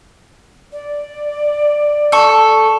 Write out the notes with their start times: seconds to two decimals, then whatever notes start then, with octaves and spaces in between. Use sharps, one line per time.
0.72 D5
2.12 A4 C#6